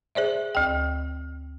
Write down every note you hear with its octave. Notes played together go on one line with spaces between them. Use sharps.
G#4 C5 D5 E5
D2 G5